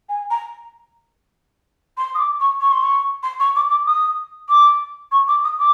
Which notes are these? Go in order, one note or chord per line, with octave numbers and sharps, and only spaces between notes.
G#5
A#5
C6
D#6
D6
C#6
C#6
C6
C#6
C6
C#6
D6
D6
D#6
D6
C#6
D6
D#6
D6